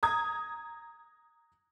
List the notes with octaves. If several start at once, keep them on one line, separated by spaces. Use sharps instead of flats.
A#5 D#6 G#6